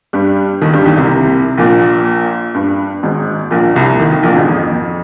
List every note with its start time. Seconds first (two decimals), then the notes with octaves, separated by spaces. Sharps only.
0.13 G2 G3
0.61 D#2 D#3
0.73 G2 G3
0.86 D#2 D#3
0.97 C2 C3
1.57 A#1 A#2
2.54 G2
3.03 G#1 G#2
3.51 A#1 A#2
3.75 C2 C3
3.99 D#2 D#3
4.12 D#2 D#3
4.23 A#1 A#2
4.36 G#1 G#2
4.48 F2